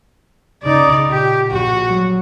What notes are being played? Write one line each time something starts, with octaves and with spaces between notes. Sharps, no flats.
C#3 D#4 D5
A#2 G4
A#1 F#4
F#3